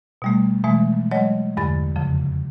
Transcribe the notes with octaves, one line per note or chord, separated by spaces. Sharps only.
B2 G3 A3
B2 E3 F3 G#3 A3
F#3 G#3 C#5 D#5
E2 G2 D3 B5 A6
F2 C#3 F3